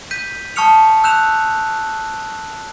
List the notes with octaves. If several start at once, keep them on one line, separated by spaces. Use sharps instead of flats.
G6 B6 D#7
A5 C#6 D#6 F6 C#7 F7
E6 F#6 G6 E7 F7